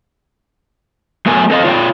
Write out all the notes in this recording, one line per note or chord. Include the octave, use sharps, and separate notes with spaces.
F#3 A3 B3 A#4 G#5
C4 A4 D#5 F5
F4 C#5 D5 F5 G5